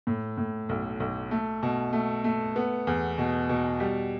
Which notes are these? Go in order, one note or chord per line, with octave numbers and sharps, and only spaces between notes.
A2
A2
B1
B1
A3
B2
A3
A3
B3
E2
B2
B2
G3